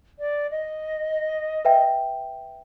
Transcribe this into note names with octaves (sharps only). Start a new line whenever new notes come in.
D5
D#5
B4 E5 G5